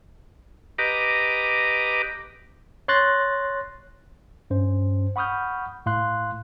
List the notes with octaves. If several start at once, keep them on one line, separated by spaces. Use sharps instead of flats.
G4 B4 D#5 A#5 D6
C#5 C6 F#6 A6 A#6
G2 C#4 C5
F#5 B5 C#6 D#6 F6 G6
A2 F5 C6 F#6